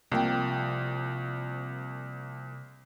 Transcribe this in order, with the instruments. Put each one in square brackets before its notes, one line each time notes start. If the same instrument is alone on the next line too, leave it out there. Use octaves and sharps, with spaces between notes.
[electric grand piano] C2 [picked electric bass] C3 C4 [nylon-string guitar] F3 A#3 G5